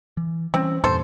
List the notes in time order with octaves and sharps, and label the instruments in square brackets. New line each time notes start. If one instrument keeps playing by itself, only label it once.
[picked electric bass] E3
[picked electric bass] E3 G3 C#4 [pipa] C4
[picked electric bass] E2 G2 A#2 [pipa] A4 C5